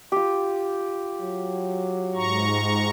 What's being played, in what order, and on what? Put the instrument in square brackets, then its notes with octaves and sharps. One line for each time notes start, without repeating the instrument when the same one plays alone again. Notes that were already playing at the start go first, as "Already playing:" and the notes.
[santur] F4 G4
[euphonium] F#3
[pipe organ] G#2 A#5 C#6